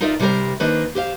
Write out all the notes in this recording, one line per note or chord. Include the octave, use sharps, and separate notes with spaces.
D#4 F4 A#4 D5 E5
C3 G3 G4 G#4 A#4 C5
D#3 A#3 D4 B4 C5
G4 C5 F5